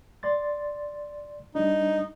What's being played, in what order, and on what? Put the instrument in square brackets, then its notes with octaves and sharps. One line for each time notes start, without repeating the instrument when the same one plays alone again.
[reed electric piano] D5 C6 A6
[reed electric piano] G3 D4 [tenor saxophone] D#4